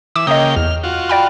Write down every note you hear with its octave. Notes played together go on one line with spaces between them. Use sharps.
E3 D6 E6
C#3 A#3 D#5 G5 D#6
E2 F6
F4 F#4
D5 G5 B5